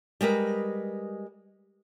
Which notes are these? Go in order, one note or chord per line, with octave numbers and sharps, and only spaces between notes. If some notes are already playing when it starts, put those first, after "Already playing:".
G3 G#3 A#4 B4